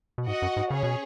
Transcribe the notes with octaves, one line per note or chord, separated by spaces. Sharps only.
B2
G#2 F#4 D#5 F#5
F#2
G#2
C#3 C#4 G#4 C#5
B2